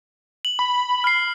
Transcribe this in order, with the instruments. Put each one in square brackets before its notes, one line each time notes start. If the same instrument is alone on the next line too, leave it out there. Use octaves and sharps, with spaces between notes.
[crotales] F#7
[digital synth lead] B5
[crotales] F6 C7